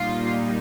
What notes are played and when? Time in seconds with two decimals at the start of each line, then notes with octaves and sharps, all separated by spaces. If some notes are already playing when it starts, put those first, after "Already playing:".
Already playing: A#2 G3 A#3 D#4 F4